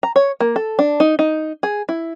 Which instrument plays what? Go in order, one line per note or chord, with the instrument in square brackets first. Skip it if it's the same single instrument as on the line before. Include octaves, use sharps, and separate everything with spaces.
[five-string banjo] A#5
C#5
A#3
A4
D4
D#4
D#4
G#4
E4